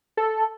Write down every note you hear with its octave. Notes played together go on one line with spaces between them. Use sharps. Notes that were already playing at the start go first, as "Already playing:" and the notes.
A4